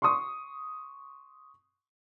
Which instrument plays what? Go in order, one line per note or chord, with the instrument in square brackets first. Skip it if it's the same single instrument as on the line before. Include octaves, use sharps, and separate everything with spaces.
[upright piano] C6 C#6 D#6